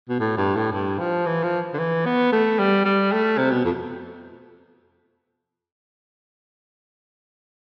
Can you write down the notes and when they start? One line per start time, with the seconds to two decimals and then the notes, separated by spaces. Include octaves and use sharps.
0.09 B2
0.20 A2
0.37 G2
0.55 A2
0.72 G2
0.99 F3
1.26 E3
1.43 F3
1.74 D3
1.79 E3
2.06 B3
2.32 A3
2.59 G3
2.85 G3
3.12 A3
3.38 C3
3.51 B2
3.65 F2